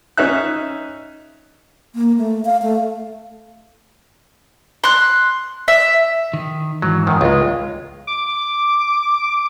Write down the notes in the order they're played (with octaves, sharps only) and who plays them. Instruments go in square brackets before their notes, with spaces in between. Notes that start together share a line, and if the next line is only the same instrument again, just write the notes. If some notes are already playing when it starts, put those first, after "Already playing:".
[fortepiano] C#4 D#4 E5 F#6
[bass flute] A#3
A3
F5
A3
[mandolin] C6 F#6
E5
[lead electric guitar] D#3
[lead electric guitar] G#2 E3 [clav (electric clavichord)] F#3
[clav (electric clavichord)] F#2 D#3
[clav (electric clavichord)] C#2 G#3 [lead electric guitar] F4
[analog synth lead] D6